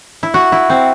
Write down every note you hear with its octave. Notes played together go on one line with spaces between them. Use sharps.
E4
F#4
E4
C4